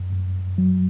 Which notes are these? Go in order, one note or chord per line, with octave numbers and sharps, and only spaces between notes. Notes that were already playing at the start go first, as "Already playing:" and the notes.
Already playing: F#2
F#2
F#3